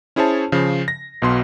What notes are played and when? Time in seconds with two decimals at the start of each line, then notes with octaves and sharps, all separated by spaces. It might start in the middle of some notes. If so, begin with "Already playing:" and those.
0.16 C#4 E4 G#4 C5 C#5 A5
0.52 C#3 F3
0.88 A#6
1.22 B1 B2 C6